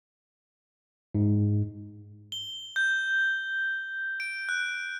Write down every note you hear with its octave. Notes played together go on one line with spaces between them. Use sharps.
G#2
G7
G6
D7
F#6